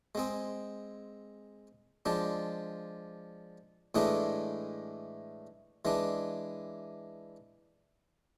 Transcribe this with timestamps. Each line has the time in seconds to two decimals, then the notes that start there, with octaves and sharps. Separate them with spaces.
0.15 G#3 C4 G#4
2.06 F3 G#3 D4
3.95 A2 E3 G#3 D4 G#4
5.85 E3 G#3 D4